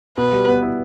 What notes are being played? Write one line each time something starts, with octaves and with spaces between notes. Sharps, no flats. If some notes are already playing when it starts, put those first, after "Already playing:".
B2 B4
G3
B3
E4